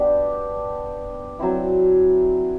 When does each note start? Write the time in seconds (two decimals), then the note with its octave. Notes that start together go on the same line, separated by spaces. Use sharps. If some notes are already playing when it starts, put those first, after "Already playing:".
Already playing: B3 D4 G4
1.39 F#3 C4 E4